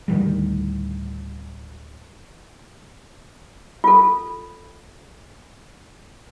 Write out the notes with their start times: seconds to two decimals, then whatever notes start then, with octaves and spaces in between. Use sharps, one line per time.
0.08 D2 A2 D#3 G3
3.84 F4 A4